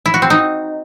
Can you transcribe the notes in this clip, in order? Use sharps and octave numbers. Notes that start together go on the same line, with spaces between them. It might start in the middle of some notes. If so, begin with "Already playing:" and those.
E4
F#4
C4
D#4